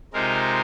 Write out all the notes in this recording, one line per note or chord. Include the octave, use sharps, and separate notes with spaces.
C3 G#3 C4 D#4 F4 A#4